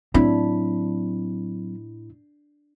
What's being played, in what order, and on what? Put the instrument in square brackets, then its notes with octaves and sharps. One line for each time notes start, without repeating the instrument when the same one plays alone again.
[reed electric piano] A2 E4 B5 [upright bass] F#3 C4 [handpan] D4